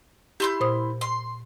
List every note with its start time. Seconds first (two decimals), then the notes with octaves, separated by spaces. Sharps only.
0.40 E4 G4 C6 G6
0.60 A#2 C5 D#6
1.01 C6